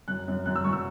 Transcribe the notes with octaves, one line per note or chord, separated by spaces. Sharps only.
F#2 F#6
F#2
F#2 F#6
E6
F#2 C#6
E6